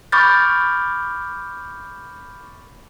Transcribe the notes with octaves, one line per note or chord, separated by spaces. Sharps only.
B5 C#6 D6 F6 G6 A6